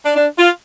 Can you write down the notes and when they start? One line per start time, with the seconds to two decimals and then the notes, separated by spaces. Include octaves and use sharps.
0.04 D4
0.16 D4
0.38 F4